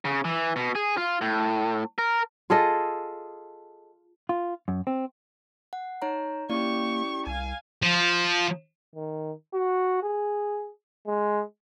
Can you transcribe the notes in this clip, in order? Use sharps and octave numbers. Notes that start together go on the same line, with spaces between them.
C#3
E3
B2
G#4
F4
A2
A#4
F4 G#4 A4 D#5
F4
F#2
C4
F#5
D#4 C#5 A#5
A#3 C#4 E4 G4 D5 C#6
C2 F5 G#5
F3
D#3
F#4
G#4
G#3